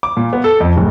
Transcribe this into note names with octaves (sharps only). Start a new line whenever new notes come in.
D6
A#2
B3
A4
F2
D1